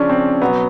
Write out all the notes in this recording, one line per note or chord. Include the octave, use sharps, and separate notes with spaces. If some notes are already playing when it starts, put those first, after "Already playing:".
Already playing: C#3 F3 C#4 D4
C4
B2 F#3 B3